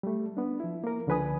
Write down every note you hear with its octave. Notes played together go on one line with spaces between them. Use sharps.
G3 A3
B3 D4
F3 E4
A#3 A#4
C#2 D3 F3 B4 G#5 D#6